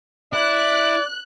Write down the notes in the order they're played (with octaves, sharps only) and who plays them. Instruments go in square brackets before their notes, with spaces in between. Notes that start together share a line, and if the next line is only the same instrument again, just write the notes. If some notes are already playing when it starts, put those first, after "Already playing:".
[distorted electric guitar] E4 [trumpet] D5 [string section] F#6